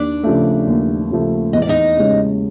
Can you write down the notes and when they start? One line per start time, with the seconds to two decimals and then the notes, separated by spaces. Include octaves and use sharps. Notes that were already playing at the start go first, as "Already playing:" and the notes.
Already playing: D#2 D4 D5
0.24 C#3 F3 A3
0.67 D#2
1.10 C#3 F3 A3
1.53 E2 D#5
1.62 D5
1.69 D#4 D#5
1.97 C#3 E3 G#3 C#4